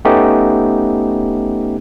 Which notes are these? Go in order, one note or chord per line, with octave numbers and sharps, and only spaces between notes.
A3 B3 C#4 D#4 G4